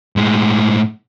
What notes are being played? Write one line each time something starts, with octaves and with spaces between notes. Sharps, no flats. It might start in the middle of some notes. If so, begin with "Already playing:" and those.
A2 G#3